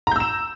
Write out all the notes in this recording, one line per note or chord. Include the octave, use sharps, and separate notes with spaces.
A#5 E6 G6 E7